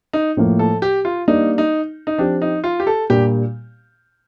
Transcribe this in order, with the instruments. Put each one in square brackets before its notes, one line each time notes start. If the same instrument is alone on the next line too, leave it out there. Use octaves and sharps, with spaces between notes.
[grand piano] D#4
[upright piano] A2 F3 A#3
[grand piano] A4
G4
F4
[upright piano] G3 A#3 D4 [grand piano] D#4
[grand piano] D#4
D#4
[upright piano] F3 C4 G4 [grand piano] D4
[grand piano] D#4
F4
G4
A4
[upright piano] A#2 G3 A#3 D4 [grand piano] G4